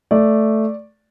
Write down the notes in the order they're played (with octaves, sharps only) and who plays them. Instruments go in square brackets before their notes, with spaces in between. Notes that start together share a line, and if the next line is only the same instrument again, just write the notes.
[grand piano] A3 D5